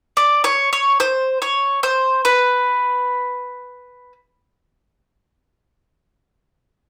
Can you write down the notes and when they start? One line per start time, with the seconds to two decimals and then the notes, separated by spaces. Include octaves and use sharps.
0.17 D5
0.44 C#5
0.73 C#5
1.00 C5
1.42 C#5
1.83 C5
2.25 B4